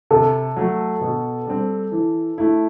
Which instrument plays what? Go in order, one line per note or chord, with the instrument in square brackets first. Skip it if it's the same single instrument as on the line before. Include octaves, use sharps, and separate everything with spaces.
[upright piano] C3 [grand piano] A4
[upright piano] F#3 A3
B2
G3 C4
E3
A3 E4